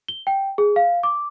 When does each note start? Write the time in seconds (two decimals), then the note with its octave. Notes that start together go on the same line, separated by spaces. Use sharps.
0.08 G7
0.27 G5
0.58 G#4
0.76 F5
1.03 D6